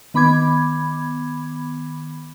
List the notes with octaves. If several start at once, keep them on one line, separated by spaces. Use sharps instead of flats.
D#3 B3 B5 D6 G#6